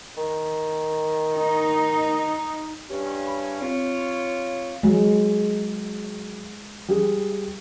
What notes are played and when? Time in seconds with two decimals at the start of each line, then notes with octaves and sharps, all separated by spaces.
0.17 D#3
1.33 D#4
2.90 G2 C#4 G4
3.27 B5
3.61 C4 F4 C#5
4.83 F#3 G#3
6.88 G3 G#4